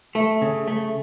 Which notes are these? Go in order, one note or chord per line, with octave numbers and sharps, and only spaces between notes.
A3
C#3
A3